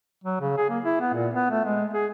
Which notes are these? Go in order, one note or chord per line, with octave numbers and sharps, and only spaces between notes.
F#3
C#3
G#4
A#3
E4
B3
A#2
B3
A3
G#3
G#4